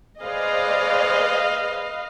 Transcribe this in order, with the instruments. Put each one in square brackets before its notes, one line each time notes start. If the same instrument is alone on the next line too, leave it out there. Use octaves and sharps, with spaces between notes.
[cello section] G#4 C5 D5 [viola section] B4 D#5 F5